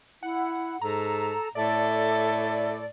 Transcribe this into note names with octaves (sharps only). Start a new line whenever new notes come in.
E4 F#5
G#2 A4 A#5
A2 A4 D5 E5